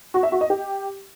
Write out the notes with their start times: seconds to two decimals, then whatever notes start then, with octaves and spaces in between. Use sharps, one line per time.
0.14 F#4
0.23 E5
0.32 F#4
0.41 D#5
0.50 G4